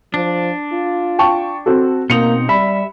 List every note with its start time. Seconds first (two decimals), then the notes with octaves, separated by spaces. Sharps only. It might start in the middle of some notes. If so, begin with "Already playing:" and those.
0.14 F3 D4
0.73 F4
1.19 G5 A5 C#6
1.66 C4 F#4 A4
2.10 B2 A#3 C4 D#4 C#7 F7
2.49 G3 E5 B5